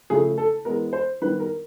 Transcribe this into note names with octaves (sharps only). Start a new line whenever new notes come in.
C#3 F3 A3 G#4
A4
E3 G#3 B3 A#4
C5
D#3 G3 B3 B4
A#4